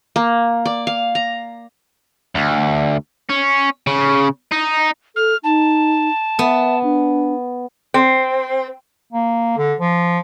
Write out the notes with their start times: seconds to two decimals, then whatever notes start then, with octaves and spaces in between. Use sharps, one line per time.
0.16 A#3
0.66 D5
0.87 F5
1.15 A#5
2.35 D2
3.30 C#4
3.87 C#3
4.52 D#4
5.16 A4 F6
5.44 D#4 A5
6.39 B3 E5
6.83 D4
7.94 C4
9.13 A#3
9.57 D3
9.79 F3